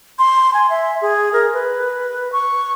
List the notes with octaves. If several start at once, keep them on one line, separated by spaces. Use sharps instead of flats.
C6
G#5
E5
G#4
A#4
B4
C#6